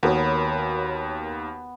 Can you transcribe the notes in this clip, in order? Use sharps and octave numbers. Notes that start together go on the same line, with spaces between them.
D#2 B3 F#4 A#4 C#5